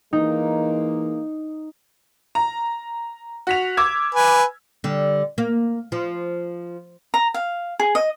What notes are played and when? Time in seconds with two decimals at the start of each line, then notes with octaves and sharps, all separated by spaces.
0.13 E3 G#3 A#3 D#4
2.35 A#5
3.47 F#4 B6 F7
3.77 D6 E6 G#6
4.15 B4 G#5
4.84 D3 G3
5.38 A#3
5.92 F3
7.14 A#5
7.34 F5
7.80 G#4
7.95 D#5